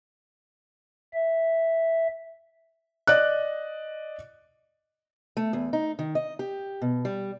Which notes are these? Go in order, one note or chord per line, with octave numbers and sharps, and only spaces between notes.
E5
D5 D#5 F#6
A3
E2
D#4
D#3
D#5
G4
B2
G3